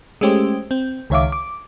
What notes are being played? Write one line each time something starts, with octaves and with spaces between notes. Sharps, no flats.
G#3 A3 C#4 G4 C5
C4
C#2 D#3 C#5 E5 F5 D6
D6